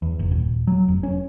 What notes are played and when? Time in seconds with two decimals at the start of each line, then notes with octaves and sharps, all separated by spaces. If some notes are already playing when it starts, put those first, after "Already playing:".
0.02 E2
0.19 F#1
0.31 D#1
0.67 F#3
0.88 F1
1.03 C#4